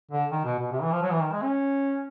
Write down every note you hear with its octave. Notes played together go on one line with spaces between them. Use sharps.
D3
D#3
B2
B2
C3
E3
F3
F#3
E3
D#3
G#3
C#4